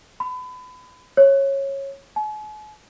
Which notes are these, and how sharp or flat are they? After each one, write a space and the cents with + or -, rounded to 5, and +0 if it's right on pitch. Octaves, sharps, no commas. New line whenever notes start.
B5 +30
C#5 -15
G#5 +45